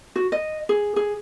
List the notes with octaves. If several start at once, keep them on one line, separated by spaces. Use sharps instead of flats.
F#4
D#5
G#4
G#4